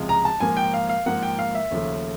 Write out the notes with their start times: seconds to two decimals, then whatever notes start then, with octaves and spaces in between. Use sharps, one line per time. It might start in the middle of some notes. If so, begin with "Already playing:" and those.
Already playing: C#2 C3 F3 G#3
0.09 A#5
0.25 A5
0.40 G#2 F3 A#3 G#5
0.57 G5
0.74 F5
0.89 F5
1.06 G#2 F3 A#3 F#5
1.23 G5
1.39 F5
1.55 E5
1.71 D#2 C#3 F3 A3